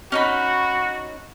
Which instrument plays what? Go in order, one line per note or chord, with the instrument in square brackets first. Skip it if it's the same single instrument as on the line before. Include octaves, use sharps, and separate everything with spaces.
[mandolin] C#4 D#4 B5 [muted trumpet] F#4